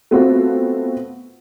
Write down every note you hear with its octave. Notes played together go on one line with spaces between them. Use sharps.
A3 B3 C4 F4 F#4 A4